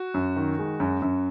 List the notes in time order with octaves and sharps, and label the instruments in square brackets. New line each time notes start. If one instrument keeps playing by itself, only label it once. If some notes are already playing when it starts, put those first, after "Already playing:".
Already playing: [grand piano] F#4
F#2
D#3
G#3
F#2
F#2